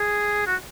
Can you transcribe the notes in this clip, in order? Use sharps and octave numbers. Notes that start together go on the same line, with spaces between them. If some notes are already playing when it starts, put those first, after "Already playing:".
Already playing: G#4
F#4